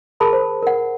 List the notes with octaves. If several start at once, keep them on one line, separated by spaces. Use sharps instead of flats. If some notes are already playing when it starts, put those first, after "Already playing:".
G#4 A#4 A5 B5 D#6
C5
A#4 F#5